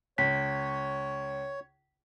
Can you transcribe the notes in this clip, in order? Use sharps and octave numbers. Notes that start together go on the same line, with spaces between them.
C#2 C#5 B6